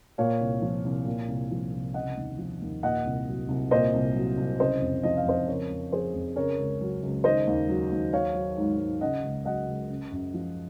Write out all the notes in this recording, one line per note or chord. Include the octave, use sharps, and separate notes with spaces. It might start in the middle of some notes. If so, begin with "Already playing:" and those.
A#2 C#5 F5
C2
F3
C2
A#2
C2
F3
C2
C#3 D#5 F#5
D#2
F3
D#2
A#2 D#5 F#5
C2
F#3
C2
A#2 C5 D#5
C2
F#3
C2
C#3 C5 D#5
F2
F3 D#5
F5
F2 C5 D#5
C#3 A#4 C#5
F2
F3 G#4 C5
F2
C#3 A#4 C#5
C#2
F#3
C#2
D#3 C5 D#5
D#2
F#3
D#2
F#3 C#5 F5
F#3
G#2
G#2
C#3 D#5 F#5
C#2
F#3 D#5 F#5
C#2
C#3
F#2
F3